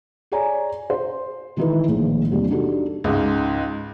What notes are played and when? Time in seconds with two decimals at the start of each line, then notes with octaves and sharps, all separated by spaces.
0.32 G#4 A4 C#5 D5 G#5 A#5
0.90 C5
1.57 D#3 E3 D#4 E4 A4 B4
1.88 A#1 A2 D#3 G#3
2.31 E2 C3 G3 A#3 D4
2.51 D4 D#4 F#4 G4 A4
3.04 C#2 G#2